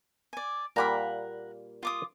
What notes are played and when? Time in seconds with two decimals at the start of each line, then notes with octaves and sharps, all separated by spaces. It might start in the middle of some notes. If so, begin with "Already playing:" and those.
0.33 D5 G#5
0.76 A#2 G3 A#3 A#4 F#5 B5
1.83 F4 D6 D#6